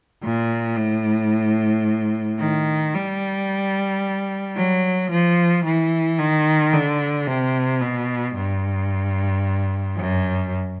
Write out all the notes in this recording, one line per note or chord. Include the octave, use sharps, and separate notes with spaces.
A#2
A2
D#3
G3
F#3
F3
E3
D#3
D3
C3
B2
G2
F#2